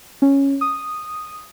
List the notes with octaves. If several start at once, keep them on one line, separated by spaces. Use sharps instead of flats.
C#4
D#6